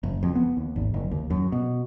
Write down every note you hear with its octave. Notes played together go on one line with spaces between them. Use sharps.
F#1
F2
B3
D#2
G#1
F#1
D#2
F#2
B2